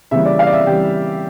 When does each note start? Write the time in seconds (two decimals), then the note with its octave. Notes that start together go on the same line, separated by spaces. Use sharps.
0.11 C#3 E3 G3 A#3 E5
0.25 D5
0.39 F5
0.46 D5
0.53 E5
0.67 C#3 E3 G3 G4